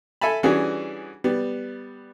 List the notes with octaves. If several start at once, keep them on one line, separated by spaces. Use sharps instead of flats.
A4 E5 G#5 A5 B5
E3 G3 C#4 D4 F#4 G#4
G3 B3